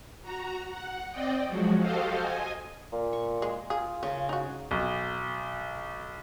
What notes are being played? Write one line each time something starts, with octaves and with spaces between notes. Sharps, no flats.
F#4 A#5
F#5
C4 D5 D#5 G5
F3 F#3 G#3 F#4
F#4 G4 A4 C5 D#5 F5
D#5 G#5
A#2
C#6
G#3
F4 G#4
C#3 C#4 A#4
D#4 F#4
B1